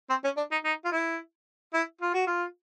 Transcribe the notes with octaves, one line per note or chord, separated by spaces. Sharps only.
C4
C#4
D4
D#4
D#4
F4
E4
E4
F4
F#4
F4